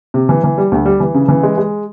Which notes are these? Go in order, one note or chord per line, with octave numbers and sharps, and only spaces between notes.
C3
E3
E3
G3
D2
G3
E3
C#3
E3
G#3
G#3